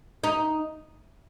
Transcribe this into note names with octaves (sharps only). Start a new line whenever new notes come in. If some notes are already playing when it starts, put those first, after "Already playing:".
D#4